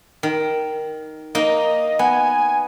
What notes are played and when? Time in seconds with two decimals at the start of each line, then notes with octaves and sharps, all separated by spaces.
0.23 D#3
1.35 A#3 D#4 D#5
1.99 B3 G#5